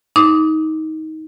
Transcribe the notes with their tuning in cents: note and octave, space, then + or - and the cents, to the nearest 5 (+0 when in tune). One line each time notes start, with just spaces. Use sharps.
D#4 +20 D6 -5